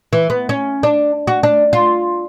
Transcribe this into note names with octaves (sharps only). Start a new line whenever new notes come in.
E3
B3
C#4
D4
F#4
D4
F4